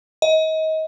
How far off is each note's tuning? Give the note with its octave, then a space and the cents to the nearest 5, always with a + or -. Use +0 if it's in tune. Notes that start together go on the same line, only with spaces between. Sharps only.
D#5 +30